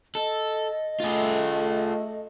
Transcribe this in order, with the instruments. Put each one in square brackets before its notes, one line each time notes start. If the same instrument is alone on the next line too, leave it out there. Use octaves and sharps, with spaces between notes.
[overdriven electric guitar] A4 [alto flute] D#5
[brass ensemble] A3 [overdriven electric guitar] F4 G#4